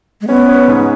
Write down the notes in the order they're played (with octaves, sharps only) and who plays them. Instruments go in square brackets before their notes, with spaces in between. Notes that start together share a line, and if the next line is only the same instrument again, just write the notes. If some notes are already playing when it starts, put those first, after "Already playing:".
[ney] G#3
[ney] B3 [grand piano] C#4
[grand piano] C#4
G#2